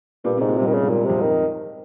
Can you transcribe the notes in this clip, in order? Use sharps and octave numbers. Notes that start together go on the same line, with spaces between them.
G2 A#2
C3
G#2
A#2
G2 C3
D#3
G2 C#3
G#2
A#2
G2
F2 C3
D#3